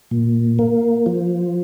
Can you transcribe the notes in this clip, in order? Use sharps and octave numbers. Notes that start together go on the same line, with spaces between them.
A#2
A#3
F3